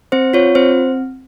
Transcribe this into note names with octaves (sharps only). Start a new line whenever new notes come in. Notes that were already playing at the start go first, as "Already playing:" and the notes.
C4 C5
F4 C#5
C4 C5